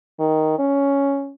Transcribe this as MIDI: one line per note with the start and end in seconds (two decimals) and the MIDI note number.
0.19 0.56 51
0.59 1.32 61